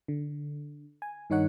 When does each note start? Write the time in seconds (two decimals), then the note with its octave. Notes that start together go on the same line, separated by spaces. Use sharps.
0.08 D3
1.02 G#5
1.30 G2 D#3 D#4 C#5 F#5